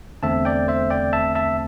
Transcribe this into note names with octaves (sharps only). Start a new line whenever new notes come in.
E2 D3 A3 C4 E5 A5
D5 G5
C5 E5
D5 G5
E5 A5
E5 A5